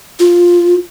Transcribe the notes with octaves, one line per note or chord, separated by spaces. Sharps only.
F4